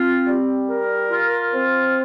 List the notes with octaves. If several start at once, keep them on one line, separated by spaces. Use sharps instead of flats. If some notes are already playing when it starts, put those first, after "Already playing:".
Already playing: C4 F4
G3
A#4
F4
C4